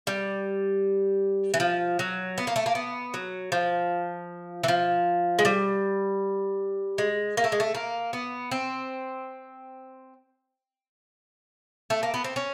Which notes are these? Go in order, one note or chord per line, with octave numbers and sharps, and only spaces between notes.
G3
E3
F3
F#3
B3
A#3
A3
A#3
B3
F#3
F3
E3
F3
G#3
G3
G#3
A#3
A3
G#3
A3
A#3
B3
C4
A3
A#3
B3
C4
C#4